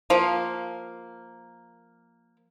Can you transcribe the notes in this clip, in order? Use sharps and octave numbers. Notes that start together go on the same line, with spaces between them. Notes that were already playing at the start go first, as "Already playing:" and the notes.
F3 A#3